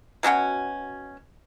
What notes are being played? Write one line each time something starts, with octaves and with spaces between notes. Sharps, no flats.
B2 F#3 C#4 F#5